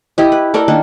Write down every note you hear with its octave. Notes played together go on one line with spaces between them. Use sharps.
E4 G4 D#5
B4
A4 A#4 D5
D#3 A#3 D4